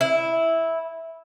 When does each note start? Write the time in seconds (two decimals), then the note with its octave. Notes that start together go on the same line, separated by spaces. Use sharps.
0.01 E4